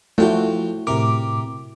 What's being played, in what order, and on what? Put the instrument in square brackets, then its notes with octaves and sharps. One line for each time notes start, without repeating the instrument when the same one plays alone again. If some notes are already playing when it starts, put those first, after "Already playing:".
[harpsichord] F3 G5 D6 [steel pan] A3 [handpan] E4 F#4
[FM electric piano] A2 D6 [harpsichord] C3 A#4